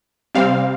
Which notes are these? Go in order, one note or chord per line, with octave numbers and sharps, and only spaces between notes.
C3 G3 C4 F5